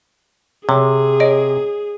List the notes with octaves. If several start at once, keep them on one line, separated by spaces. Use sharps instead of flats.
C3 G#4 C#5
C#5 D#5 D7